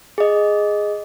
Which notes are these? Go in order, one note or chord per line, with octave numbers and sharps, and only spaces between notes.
G#4 D#5